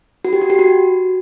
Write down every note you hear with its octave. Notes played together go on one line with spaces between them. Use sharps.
F#4
G4
F#4
G4
F#4